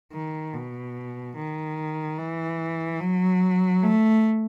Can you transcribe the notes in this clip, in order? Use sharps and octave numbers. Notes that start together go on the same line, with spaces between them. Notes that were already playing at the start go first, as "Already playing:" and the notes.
D#3
B2
D#3
E3
F#3
A3